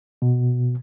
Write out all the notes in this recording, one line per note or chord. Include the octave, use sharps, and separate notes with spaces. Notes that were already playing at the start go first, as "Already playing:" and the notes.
B2